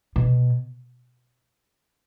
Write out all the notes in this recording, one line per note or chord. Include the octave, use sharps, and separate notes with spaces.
B2